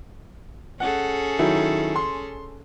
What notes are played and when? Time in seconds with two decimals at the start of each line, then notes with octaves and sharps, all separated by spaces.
0.80 C#4 G#4 A4 F#5
1.39 D#3 F#3 E4
1.96 C6